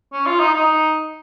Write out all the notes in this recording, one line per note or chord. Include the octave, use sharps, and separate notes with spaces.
C#4
F4
D#4
D#4